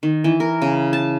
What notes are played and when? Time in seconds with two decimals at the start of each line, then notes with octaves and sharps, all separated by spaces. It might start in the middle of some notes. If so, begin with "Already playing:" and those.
0.03 D#3
0.24 E3
0.40 A#4
0.62 C#3
0.93 A5